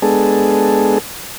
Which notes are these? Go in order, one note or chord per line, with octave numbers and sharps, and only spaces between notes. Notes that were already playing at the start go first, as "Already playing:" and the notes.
G#3 B3 D4 G#4 A4